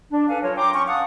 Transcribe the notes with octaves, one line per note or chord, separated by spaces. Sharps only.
D4
D4 A4 B4 F5 G#5
F#3 F4 A#4 C#5
G5 A#5 C6 D6
C#4 C#6
F5 F#5 A5 D#6